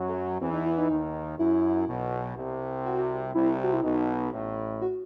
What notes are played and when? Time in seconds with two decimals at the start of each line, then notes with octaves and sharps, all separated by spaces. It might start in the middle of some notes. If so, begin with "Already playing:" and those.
Already playing: F#2 F#3
0.09 A3
0.41 E2 E3 C4
0.53 D#4
0.66 E4
0.78 D#4
0.90 D#2 D#3
1.39 F#2 E4
1.87 B1 B2
2.36 C2 C3
2.86 F#4
3.34 C2 C3 E4
3.64 F#4
3.74 E4
3.84 B1 B2 D#4
4.33 A1 A2
4.81 F#4